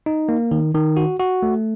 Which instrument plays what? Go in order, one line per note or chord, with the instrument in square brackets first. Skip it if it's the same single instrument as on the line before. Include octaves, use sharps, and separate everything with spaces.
[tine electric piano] D#4
A#3
D#3
D#3
F#4
F#4
A3